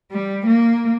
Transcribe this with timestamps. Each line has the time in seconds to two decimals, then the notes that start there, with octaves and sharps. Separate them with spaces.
0.11 G3
0.46 A#3